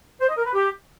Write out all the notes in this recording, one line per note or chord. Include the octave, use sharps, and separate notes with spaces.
C5
D#5
A#4
B4
G4